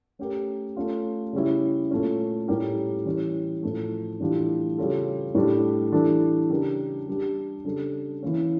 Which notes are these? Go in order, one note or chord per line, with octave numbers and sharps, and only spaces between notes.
A3 C#4 G4 A#4
A3 C#4 F4
C#3 G3 C#4 E4
A#2 A3 C#4
A2 G3 C#4 G4 A#4
E3 G3 C#4
A2 F3 A3
A2 E3 G3 D4 F4
C#3 G3 C#4 F4 A4
A2 G3 D4
E3 G3 D4 A4
C#3 G3 D4 G4 A#4
G3 D4 G4
C#3 G3 D4 A4
E3 A#3 C#4